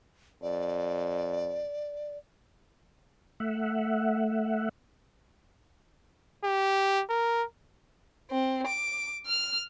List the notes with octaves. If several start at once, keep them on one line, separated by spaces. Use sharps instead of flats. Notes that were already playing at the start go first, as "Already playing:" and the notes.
F2 D5
A3 E5 F#5
G4
A#4
C4
D6
F6